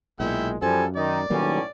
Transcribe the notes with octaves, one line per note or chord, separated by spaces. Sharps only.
B1 A#2 G#3 E4 G5
F#2 F3 G3 A4 G#5
D#3 D#4 D5
B1 A2 D#3 F#3 G3 A#3 C#4